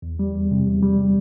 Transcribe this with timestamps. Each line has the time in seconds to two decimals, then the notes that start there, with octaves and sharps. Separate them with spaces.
0.02 E2
0.19 G3
0.35 E2
0.51 C3
0.66 E2
0.83 G3